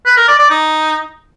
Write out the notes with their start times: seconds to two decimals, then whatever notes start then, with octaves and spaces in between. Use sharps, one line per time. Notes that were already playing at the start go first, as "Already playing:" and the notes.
0.06 B4
0.17 A#4
0.28 D5
0.39 D5
0.50 D#4